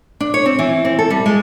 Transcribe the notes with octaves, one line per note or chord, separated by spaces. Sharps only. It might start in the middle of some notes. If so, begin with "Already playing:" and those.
D4
C#5
C4
E3
C4
A4
G3
G#3